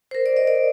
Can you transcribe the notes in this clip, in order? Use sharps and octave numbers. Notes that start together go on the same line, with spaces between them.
C5
A#4
D5
D#5
D5